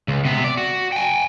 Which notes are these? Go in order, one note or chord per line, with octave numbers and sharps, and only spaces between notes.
C#2
C3 B3
D5
F#4
G5 G#5